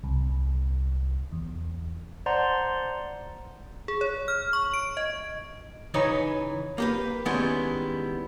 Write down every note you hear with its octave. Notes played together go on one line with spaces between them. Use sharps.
C2
E2
C5 D5 F#5 A5 A#5 C6
G#4
C#5
F6
C#6
D7
D#5
C#3 E3 D#4 B4 C#5
A#3 G4 B4
D#3 G3 G#3 B3 C#4 E4